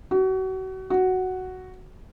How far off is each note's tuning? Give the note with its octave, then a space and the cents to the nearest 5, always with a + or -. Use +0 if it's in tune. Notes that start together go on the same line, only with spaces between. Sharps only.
F#4 +35
F#4 +5